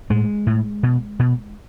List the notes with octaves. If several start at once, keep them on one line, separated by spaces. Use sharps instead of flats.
A2 G#3
A2
B2
B2